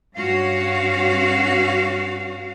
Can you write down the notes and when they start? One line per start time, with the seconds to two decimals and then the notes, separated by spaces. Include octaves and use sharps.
0.16 G2 C#4 F#4 F5